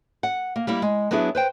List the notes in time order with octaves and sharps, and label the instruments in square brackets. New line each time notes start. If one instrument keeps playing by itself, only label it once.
[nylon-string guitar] F#5
A#3
G3 A#3 E4
G#3
F#3 B3 D4 E4 G#4
B4 C5 G5